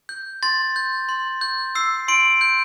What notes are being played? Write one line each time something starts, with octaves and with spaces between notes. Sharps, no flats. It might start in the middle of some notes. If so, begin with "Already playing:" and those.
G6
C6 A6
G6
C6
G6
E6 C7
C6 D7
G6